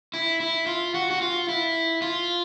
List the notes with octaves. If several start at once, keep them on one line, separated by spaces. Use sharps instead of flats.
E4
E4
F4
F#4
F#4
F4
E4
F4